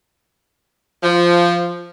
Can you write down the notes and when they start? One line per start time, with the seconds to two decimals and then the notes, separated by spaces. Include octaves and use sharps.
1.03 F3